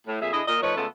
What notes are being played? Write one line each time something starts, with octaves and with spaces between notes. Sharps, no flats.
A2
F2 A#2 G#4 E5
D3 E4 G#4 D#5
A#2 A#4 D#5
F3 A3 D#4 B4 C#5
C#3 G#3 A3 B3 F4 A4